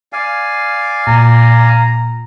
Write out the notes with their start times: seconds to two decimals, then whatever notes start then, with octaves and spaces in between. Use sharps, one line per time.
0.13 D5 F5 G#5
1.07 A#2 A#5